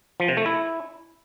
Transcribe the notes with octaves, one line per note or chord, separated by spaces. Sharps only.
F3
C3
A3
E4